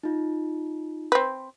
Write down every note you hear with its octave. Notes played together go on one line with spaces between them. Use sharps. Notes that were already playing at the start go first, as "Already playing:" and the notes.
D#4 F4
C4 B4